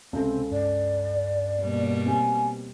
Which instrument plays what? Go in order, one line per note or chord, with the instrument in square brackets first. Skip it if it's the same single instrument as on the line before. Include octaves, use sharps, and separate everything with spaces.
[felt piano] C#2 A4 [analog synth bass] C3 [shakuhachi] C4
[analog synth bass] G2 [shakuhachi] D5
[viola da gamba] B2 G3 A#3
[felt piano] C4 G4 [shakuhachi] G#5